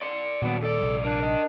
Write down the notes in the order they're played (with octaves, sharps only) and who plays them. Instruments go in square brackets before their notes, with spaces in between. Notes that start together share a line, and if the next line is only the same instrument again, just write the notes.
[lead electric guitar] D5 C6
[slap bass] A#2 D#3 G3 [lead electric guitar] F#3 D4 [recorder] B3
[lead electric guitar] F2 D5 [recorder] A4
[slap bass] A#1 C3 G3
[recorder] D4 [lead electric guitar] A#4 D5
[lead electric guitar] A#4 D#5